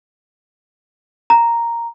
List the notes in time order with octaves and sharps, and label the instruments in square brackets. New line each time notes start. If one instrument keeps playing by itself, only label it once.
[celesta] A#5